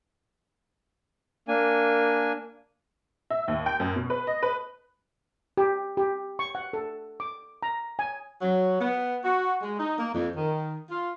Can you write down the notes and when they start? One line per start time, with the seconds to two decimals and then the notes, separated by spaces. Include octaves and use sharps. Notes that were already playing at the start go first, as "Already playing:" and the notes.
1.48 A#3 D4 G#5
3.30 E5
3.48 D#2
3.66 G5
3.80 F#2
3.96 B2
4.10 B4
4.27 D#5
4.43 B4
5.57 G4
5.97 G4
6.39 C#6
6.55 F#5
6.73 A4
7.20 D6
7.63 A#5
7.99 G#5
8.42 F#3
8.80 B3
9.24 F#4
9.62 G#3
9.79 D#4
9.99 A#3
10.15 F2
10.37 D#3
10.91 F4